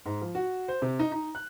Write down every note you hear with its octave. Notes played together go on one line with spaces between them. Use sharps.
G#2
F3
F#4
C5
C3
D#4
D#4
F#6